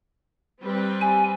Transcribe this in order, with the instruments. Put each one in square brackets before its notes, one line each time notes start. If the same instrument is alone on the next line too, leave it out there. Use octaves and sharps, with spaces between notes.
[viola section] G3 C4 B4
[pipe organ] G#5